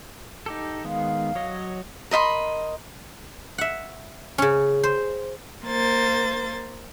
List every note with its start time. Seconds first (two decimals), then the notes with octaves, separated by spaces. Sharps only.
0.46 D#4 G4 A4
0.85 D#3 G#3 B3 F5
1.35 F#3 C#5 D#5
2.11 A#4 D#5 B5 C6
3.58 E5 F#5
4.38 C#3 C#4
4.83 C5
5.65 A#3 C5 A6